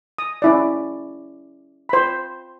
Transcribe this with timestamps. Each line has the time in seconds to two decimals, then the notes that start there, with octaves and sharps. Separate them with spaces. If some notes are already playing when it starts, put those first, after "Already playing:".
0.18 D#6
0.42 C#4 E4 D5
1.89 C5 B5